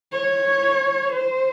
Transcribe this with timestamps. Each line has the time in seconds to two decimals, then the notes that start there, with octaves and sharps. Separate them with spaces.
0.12 C#5
1.12 C5